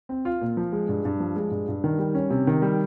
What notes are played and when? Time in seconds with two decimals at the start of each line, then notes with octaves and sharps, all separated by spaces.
0.09 C4
0.25 F4
0.41 A#2
0.57 F3
0.72 G#3
0.89 G2
1.05 G2
1.20 F3
1.36 G#3
1.51 G2
1.68 G2
1.84 D#3
1.99 G3
2.14 C#4
2.30 C3
2.47 D#3
2.62 G3